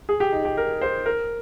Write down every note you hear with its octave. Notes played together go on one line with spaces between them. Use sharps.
G#4
G4
D#4
G4
A#4
C5
A#4